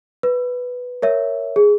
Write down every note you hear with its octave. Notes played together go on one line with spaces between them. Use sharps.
B4
A#4 C#5 E5
G#4